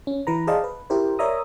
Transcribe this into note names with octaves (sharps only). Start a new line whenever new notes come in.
C#4
E3 B4 A#5
G#4 C5 D5 D#5 F5 A5
B4
E4 G4 A#4 C5
A#4 C#5 D5 E5 A#5 D#6